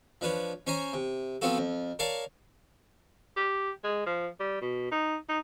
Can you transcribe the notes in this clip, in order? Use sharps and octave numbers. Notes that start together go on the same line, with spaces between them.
F3 D4 B4 C#5
C#4 C5 C#5 G#5 A#5
C3
F3 B3 C4 F4 F#4 A4
F2
A#4 C#5 D5 F5 A5
G4
G#3
F3
G3
B2
D#4
D#4